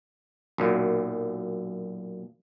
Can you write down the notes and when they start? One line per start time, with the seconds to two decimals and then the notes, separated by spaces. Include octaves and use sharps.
0.58 B1 F#2 A#2